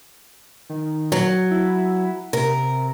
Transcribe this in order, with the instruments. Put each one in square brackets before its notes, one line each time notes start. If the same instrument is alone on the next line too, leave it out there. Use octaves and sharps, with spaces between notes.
[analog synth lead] D#3
[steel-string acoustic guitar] F#3
[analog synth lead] E4
[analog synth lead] C3 [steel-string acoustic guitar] A#4